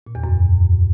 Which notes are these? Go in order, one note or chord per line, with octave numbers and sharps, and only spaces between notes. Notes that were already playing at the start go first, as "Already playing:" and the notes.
A#2
E2
F#2